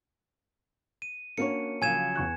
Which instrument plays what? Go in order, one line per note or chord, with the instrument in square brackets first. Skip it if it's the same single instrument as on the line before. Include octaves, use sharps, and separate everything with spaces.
[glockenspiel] D#7
[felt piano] A#3 D4 [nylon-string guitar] C#4 F#4 C#5 [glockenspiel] C#7
[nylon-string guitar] C#3 F3 F#3 [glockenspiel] G#5 G#6 E7
[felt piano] E2 C#6 F#6